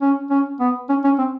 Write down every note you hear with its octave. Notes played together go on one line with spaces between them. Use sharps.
C#4
C#4
B3
C#4
C#4
C4